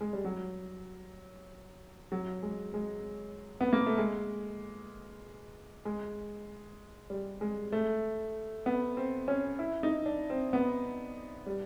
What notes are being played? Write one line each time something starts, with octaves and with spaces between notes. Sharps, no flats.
G#3
G3
F#3
F#3
G#3
G#3
B3
A#3
A3
G#3
G#3
G3
G#3
A3
B3
C4
C#4
E4
D#4
D4
C4
B3
G3